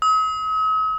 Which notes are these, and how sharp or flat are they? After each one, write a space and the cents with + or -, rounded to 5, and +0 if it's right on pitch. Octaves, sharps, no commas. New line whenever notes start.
D#6 +45